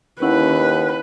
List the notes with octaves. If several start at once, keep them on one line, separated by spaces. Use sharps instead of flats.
D#2 C#4 E4 B4 F#5